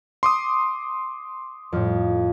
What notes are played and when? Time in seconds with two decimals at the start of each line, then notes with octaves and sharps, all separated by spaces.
0.23 C6 D6 D#6
1.72 F2 A2